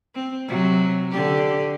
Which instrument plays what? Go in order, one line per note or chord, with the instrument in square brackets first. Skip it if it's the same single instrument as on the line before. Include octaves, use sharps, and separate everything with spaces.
[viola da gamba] C4
C3 F#3
D3 G4